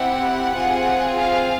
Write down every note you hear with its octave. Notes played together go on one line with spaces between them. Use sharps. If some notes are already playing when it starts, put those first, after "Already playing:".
Already playing: C4 E4 G4 F#5
C4 F4 G#4
F5